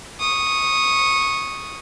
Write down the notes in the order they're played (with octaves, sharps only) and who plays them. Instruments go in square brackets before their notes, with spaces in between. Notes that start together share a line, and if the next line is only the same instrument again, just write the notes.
[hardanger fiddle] C#6 D#6